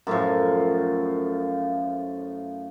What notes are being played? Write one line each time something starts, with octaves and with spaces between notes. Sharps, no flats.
F#2 A2 F3